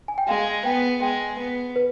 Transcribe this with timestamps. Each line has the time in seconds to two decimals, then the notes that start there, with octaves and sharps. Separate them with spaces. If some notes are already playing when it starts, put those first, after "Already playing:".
0.08 G#5
0.18 G5
0.28 G#3 F5
0.65 B3 G5
1.02 G#3 G5
1.39 B3
1.76 B4